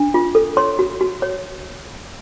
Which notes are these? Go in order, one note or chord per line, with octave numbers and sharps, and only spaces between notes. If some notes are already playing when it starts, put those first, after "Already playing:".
Already playing: D4
F4
A4
C#5 C6
F#4
F#4
C#5